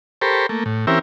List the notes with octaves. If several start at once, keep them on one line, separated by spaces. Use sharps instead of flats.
G4 A4 A#4 C5 B5 C#6
A3 A#3
A2
E3 C4 C#4 G4 A#4 E5